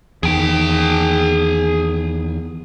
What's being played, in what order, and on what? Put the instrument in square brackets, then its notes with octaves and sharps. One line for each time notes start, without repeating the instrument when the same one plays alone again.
[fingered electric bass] E2 D#3 [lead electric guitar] G#4 G5